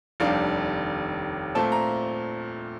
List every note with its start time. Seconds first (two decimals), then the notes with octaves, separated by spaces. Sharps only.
0.20 F1 D#2 D#3 G3 D4 F5
1.55 A#2 A3 C4 A5
1.72 A#5